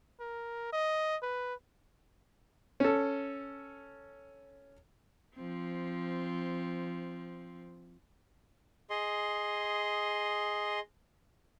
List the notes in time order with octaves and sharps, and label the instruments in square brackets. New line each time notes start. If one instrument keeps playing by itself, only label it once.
[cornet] A#4
D#5
B4
[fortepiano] C#4 A4
[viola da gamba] F3 C4
[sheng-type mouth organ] G#4 D#5 C6